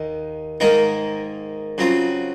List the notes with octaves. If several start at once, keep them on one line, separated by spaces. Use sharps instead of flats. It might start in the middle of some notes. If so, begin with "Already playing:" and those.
Already playing: D#2 D#3
G#2 D#3 A#3 D#4 A#4
C#3 F#3 C4 F4